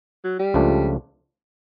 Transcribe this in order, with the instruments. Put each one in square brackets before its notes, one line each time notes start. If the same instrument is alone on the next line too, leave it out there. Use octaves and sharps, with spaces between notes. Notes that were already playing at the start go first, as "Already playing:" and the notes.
[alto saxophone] F#3
G3
[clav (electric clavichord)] C#2 C#3 F3 A3 D4